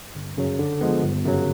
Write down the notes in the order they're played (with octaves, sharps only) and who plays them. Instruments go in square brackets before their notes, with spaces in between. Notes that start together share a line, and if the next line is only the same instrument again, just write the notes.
[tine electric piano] G1
F#2 C#3 F#3
D3
F3 G#3 B3
G1
F#2 C#3 F#3